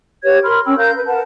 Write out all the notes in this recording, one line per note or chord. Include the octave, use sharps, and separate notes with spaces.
G4 B4 C#5 G#6
A#4 B5 C6 F6
C#4 G5 E6
A#4 F5 G6
B4
A#4 B4 F#5 A5